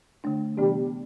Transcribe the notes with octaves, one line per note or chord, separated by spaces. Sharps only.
D3 A3 D4
C3 E3 G3 B3 D4